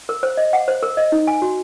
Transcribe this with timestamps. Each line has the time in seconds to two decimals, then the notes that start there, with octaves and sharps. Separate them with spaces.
0.09 A#4
0.23 C5
0.37 D#5
0.53 F#5
0.68 C5
0.83 A#4
0.97 D#5
1.12 D#4
1.27 G#5
1.42 F#4